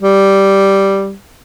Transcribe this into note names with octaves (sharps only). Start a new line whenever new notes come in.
G3